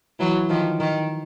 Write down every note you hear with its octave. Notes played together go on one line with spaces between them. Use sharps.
E3 F#3
D#3 F3
D#3